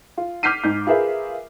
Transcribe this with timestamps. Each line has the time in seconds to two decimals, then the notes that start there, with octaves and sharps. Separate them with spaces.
0.18 F4
0.43 D6 F6 G6 B6 C7 D#7
0.64 G#2 G6
0.87 F4 G#4 A#4 B4 E5